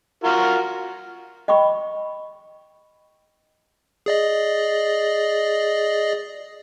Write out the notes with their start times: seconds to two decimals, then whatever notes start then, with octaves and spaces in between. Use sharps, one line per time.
0.24 F4 F#4 A#4
1.48 D#5 G5 B5 C#6
4.06 G#4 D5 D#5